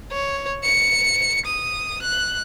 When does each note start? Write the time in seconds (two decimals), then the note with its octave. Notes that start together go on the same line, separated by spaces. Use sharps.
0.12 C#5
0.64 C#7
1.46 D#6
2.03 F#6